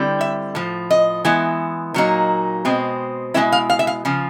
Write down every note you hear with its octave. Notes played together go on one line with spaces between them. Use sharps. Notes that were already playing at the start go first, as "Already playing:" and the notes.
Already playing: D3 G3 C4 E4
E5
A2 F3
D#5
E3 G#3 B3 E4
A#2 F#3 A#3 D#4
B2 G#3 C4
B2 G#3 C#4 E4 E5
F5
F5
E5
F5
C#3 F3